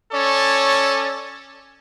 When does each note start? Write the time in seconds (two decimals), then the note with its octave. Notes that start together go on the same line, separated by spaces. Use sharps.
0.13 C#4 A4 C#5 D5